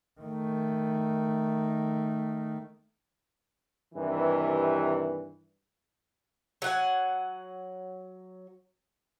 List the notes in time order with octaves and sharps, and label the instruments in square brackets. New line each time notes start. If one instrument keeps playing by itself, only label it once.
[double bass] D#3 A3
[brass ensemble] G2 C3 D#3 E3
[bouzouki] F#3 F#5 G#5